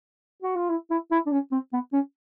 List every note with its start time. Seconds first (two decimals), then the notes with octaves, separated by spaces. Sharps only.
0.42 F#4
0.56 F4
0.69 E4
0.91 E4
1.11 E4
1.26 D4
1.32 C#4
1.52 C4
1.73 B3
1.93 C#4